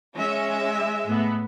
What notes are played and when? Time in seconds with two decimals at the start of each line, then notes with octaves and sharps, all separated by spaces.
0.16 G#3 C#4 E5
1.06 A2 B3